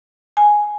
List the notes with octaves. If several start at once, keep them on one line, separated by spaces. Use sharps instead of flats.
G#5